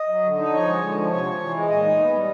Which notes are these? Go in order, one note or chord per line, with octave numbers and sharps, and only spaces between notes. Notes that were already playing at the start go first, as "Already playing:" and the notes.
Already playing: D#5
F#3
D3
D#4
F3 C#5
G#3
D3
F3
C3 C#5
F3
E3
G#3
A#2 D#5
D#4
B3
G3